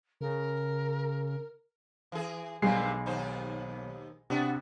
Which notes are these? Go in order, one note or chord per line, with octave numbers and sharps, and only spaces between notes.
C#3 A#4
E3 G#4
B1 G2 C3 D#3 G#3 C7
D#2 D#4 C5
C3 B3 D4 F#4